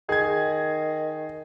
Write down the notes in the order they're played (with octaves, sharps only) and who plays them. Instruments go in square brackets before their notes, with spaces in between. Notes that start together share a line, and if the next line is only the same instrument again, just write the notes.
[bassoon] D#3 [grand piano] G#4 G#6